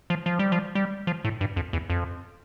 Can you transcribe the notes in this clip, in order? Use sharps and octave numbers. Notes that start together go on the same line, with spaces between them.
F3
F3
G3
F3
G3
F3
A2
G2
F2
E2
F2